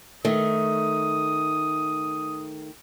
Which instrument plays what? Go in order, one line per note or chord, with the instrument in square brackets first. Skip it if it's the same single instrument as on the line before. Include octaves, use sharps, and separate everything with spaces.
[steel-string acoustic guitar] D#3 A3 [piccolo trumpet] D#6